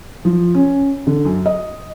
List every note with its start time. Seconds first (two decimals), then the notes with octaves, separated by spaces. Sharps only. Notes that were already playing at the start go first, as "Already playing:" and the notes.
0.25 F3
0.54 C#4
1.07 D3
1.25 F#2
1.46 D#5